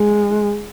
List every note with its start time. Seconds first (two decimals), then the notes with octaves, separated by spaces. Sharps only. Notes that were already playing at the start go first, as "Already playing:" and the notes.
Already playing: G#3